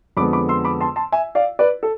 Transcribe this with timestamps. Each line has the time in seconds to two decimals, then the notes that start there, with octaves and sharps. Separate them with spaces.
0.17 F2 D3 G#3 B3 B5 D6
0.33 B5 D6
0.49 C6 E6
0.64 B5 D6
0.81 A5 C6
0.96 A5 C6
1.12 E5 G#5
1.35 D5 F5
1.59 B4 D5
1.83 A4